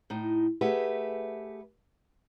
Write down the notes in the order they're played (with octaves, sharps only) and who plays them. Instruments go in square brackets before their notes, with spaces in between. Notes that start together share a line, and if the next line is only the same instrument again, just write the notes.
[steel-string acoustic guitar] A2 D#4
A3 G4 G#4 B4 E5 F#5